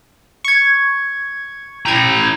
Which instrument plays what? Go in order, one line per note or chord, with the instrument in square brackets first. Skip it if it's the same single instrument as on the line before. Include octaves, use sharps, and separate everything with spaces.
[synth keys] C#6 G#6
[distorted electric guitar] E4 A#5 [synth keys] G5 G#6